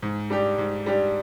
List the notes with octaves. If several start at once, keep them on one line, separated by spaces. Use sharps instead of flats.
G#2
G3 D4 G4
G#2
G3 D4 G4